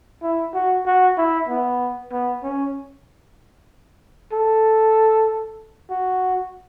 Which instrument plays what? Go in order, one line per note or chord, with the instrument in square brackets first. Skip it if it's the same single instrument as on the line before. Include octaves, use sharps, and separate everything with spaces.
[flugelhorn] E4
F#4
F#4
E4
B3
B3
C#4
A4
F#4